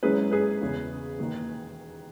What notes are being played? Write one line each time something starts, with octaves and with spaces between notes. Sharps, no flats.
G#1 G#2 F#3 C#4 E4 G#4 B4
G#4 B4
E1 E2 C#3
E1 D#2 D#3